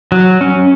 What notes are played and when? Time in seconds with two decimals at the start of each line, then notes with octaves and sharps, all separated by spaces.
0.12 F#3
0.41 C#4